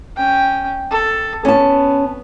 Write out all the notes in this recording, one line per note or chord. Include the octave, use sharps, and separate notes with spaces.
C#4 G5
A4
B3 C#4 A5